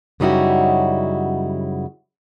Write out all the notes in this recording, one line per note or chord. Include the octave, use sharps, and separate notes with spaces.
F#2 C#3 G3 D#4 E4 F#4